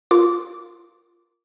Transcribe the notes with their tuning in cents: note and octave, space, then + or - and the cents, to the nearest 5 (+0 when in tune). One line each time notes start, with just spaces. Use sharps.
F4 +0 A#4 +0 D6 -15